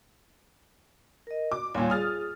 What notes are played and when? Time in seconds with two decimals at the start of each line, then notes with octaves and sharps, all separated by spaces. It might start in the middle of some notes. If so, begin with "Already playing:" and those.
1.27 A#4 D#5
1.52 F#4 D6
1.75 D#2 A#2 G3 C#5 G#5
1.90 F4 G#4 D#6 F6 A6